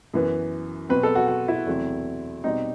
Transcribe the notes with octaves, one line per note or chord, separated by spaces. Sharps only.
F#2 E3 B3
B2 F#3 C4 B4
A4
F#4
F#4
E4
E2 C3 F#3 A3 C4
B2 G3 C4 D#4